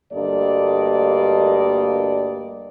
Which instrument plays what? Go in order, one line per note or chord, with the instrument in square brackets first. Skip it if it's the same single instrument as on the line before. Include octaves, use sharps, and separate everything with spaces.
[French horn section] D2 G2 A#3 A4 D5 D#5